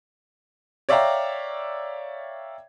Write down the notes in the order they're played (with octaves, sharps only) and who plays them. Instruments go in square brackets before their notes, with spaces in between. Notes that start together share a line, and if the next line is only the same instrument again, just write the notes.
[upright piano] C#5 D5 E5 F5 G5 A#5